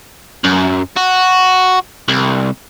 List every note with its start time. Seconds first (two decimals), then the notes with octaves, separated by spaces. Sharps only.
0.44 F#2
0.97 F#4
2.08 C2